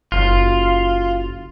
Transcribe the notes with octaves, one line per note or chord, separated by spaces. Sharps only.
F#1 F4